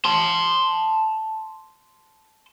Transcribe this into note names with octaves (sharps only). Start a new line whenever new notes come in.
A5 C6